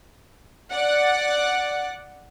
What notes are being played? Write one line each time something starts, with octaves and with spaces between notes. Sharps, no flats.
D5 F#5